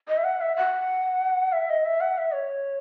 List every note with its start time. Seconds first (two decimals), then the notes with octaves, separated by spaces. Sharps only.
0.08 D#5
0.18 E5
0.24 F#5
0.41 E5
0.57 F#5
1.52 E5
1.70 D#5
1.85 E5
2.01 F#5
2.18 E5
2.34 C#5